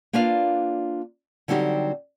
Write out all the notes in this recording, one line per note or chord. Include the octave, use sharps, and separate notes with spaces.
A#3 D4 F4 B4 D5 F5
D3 F#3 G3 C4 D#4 G4